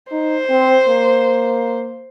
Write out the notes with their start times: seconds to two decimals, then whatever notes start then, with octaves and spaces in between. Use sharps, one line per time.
0.11 D#4 C5
0.49 C4
0.88 A#3